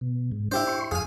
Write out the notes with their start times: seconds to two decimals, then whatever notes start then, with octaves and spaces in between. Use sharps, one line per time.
0.01 B2
0.32 G#2
0.52 D4 E4 G4 C5
0.67 C6 C#6
0.91 F2 G#4 F5 G#5